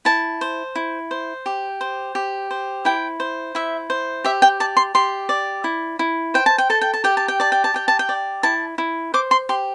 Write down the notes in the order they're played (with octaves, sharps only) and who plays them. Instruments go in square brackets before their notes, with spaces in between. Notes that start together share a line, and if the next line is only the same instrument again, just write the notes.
[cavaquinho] E4 A5
C5
E4
C5
G4
C5
G4
C5
E4 G5
C5
E4 E5
C5
G4 E5
G5
D5 A5
C6
G4 C6
D5
E4
E4
C5 G5
A5
G5
A4 A5
G5
A5
G4 G5
A5
G5
D5 A5
G5
A5
G4 G5
A5
G5
D5
E4 A5
E4
C5 D6
C6
G4 C6